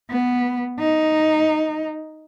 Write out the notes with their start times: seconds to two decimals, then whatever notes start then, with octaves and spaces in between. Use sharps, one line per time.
0.10 B3
0.79 D#4